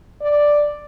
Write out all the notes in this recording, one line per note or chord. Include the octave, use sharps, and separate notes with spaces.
D5